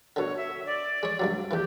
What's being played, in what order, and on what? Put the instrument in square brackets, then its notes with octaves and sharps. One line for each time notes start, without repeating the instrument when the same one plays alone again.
[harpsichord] B2 D3 [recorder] C#5
[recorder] E5
D5
[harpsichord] G#3 C#5
C#2 G2 F#3
[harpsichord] E2 E3 [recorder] G4